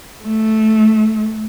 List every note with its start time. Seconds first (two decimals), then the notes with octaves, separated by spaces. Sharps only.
0.24 A3